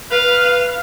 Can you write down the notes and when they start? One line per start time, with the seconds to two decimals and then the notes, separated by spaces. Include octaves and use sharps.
0.11 B4 F5